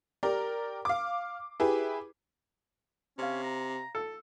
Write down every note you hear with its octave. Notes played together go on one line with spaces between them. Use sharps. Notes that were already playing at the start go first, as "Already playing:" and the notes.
G4 A#4 D5
F5 D6
E4 G4 G#4 B4
C3 C#4 C#5 F5
A#5
A4